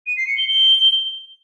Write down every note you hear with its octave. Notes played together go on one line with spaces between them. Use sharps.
D#7
C7
C#7
G7
G7